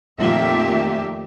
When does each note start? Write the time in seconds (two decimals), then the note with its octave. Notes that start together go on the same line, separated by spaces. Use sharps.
0.19 F2 A#2 D#3 A3 G4 E5